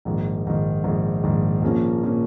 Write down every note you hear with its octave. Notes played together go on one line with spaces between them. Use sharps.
A#1 G#2 D#3
A#1 G#2 D#3
A#1 G#2 D#3
A#1 G#2 D#3
A#1 A#2 F3 A#3 C#4
A#2 F3 A#3 C#4